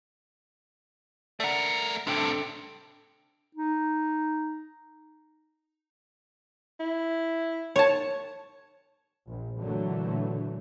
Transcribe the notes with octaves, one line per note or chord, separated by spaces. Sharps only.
A3 A#4 D5 F#5
A2 C3 D4 A4 G5
D#4
E4
C#5 A5
A#1
A#2 D3 E3 F#3 A3